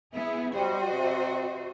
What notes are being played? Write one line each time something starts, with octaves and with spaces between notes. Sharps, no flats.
B3 E4 G#4
G3 F#4 C5 D#5
C3